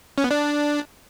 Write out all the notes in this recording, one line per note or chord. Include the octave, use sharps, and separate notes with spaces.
C#4
B3
D4